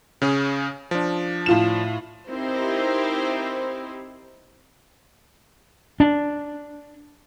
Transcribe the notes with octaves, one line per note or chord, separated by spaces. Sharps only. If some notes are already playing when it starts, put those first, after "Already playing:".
C#3 C#4 G#4
F3 D4
A2 F4 E7
C4 D#4 E4 G4 A#4 C5
D4